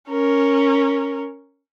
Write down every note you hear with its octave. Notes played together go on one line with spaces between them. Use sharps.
C#4 A#4